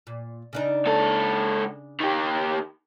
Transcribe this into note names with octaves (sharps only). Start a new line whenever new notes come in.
A#2
C#3 D4 D#4
G#2 A4
D#3 G4